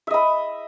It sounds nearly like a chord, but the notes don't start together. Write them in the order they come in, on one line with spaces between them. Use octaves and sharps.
E5 D#5 B5